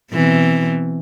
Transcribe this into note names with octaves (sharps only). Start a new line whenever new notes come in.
B2 E3 C4